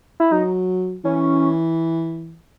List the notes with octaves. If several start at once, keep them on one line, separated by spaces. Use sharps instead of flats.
E4
F#3 D#4
E3 C#4